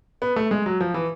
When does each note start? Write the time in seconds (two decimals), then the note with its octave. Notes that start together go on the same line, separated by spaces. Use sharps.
0.22 B3
0.36 A3
0.51 G#3
0.66 F#3
0.80 F3
0.94 E3